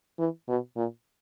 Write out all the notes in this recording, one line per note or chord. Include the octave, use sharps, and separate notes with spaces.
E3
B2
A#2